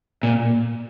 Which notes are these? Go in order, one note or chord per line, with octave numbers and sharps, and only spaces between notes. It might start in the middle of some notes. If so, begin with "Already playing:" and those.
A#2